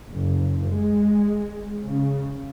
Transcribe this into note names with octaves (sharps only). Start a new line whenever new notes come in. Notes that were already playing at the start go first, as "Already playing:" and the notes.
F#1
G#3
C#3